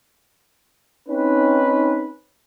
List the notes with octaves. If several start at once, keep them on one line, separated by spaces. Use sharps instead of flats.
C4 C#4 D#4 B4